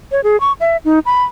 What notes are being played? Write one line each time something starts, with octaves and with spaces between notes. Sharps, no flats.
C#5
G#4
C#6
E5
D#4
B5